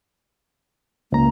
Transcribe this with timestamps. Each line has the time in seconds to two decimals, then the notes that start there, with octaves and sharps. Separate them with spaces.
1.12 C#2 A#3 A#5